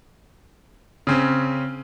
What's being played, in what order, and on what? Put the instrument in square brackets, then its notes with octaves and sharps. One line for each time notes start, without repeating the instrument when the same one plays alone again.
[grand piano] C#3 C4 C#4